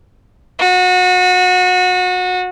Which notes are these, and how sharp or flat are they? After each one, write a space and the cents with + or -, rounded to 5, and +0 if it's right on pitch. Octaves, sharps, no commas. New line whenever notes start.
F#4 -30